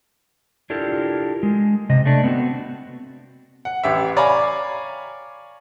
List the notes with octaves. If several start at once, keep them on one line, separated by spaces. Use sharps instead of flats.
D4 E4 F4 G4 A4 A#4
G#3
C3 D#5
A3 D4
B3 C4 F#4
F#5
A1 G4 E5
C#5 D5 F5 G#5 A#5 B5